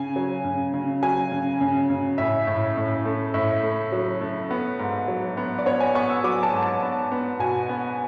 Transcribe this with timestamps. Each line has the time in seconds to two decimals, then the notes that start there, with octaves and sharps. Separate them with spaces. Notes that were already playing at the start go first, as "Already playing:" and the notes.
Already playing: C#3 G#5
0.16 F#3
0.44 C#3
0.74 C#3
1.03 F#3 G#5
1.32 C#3
1.61 C#3
1.90 C#3
2.18 A2 E5
2.47 A2
2.77 A2
3.05 A3
3.34 A2 E5
3.63 A3
3.92 F#3
4.21 A3
4.51 B3
4.79 G#2
5.08 F#3
5.37 B3
5.59 D5
5.66 B3 C#5
5.80 G#5
5.95 B3 C#6
6.09 E6
6.24 F#3 D6
6.43 A5
6.53 G#2
6.62 A5
6.82 B3
7.11 B3
7.39 B2 G#5
7.69 B3